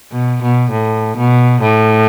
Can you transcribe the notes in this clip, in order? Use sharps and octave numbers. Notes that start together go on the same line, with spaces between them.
B2
B2
A2
B2
A2